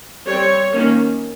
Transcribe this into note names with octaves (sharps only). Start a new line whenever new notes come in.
G3 C4 C#5
D#3 A#3 C#4